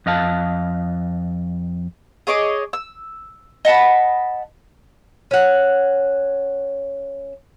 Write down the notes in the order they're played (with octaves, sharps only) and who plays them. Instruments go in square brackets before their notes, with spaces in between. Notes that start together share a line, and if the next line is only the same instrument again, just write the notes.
[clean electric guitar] F2 D#5 F5 A5
[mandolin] G#4 C#5 D#5 D6
E6
D#5 F#5 A5 B5
[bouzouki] C#4 F#5